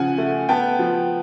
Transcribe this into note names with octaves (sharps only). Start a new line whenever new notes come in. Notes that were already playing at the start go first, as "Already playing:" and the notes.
Already playing: C#3 F3 F#5 G#5
A3
B3 G5 A5
F3